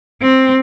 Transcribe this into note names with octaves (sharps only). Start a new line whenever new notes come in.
C4